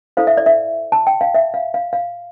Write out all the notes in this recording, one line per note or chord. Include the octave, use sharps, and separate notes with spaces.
E4 A4 C5 F5
E5
D5
E5
A5
G5
F5
E5
F5
F5
F5